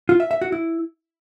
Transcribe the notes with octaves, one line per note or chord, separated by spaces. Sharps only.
F4
E5
E5
F#4
E4